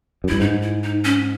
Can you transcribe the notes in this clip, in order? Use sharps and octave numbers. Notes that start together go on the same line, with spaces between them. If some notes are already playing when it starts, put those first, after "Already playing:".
F#2
G2 E4
G#2 D#4
E4
D#4
C#4